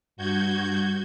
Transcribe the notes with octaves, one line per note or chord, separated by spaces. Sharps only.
G2 F#4 G6 G#6